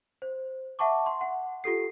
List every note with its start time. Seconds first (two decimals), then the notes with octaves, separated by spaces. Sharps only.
0.22 C5
0.79 E5 F#5 A5 C#6 D6
1.06 C6
1.21 F#5
1.64 F4 G4 A4 C7